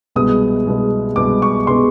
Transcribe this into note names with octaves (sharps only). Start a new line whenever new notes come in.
C2 B2 G#3 B3 D#6
C2 B2 G#3 B3
C2 B2 G#3 B3 D6
C#6
B2 G#3 B3 C6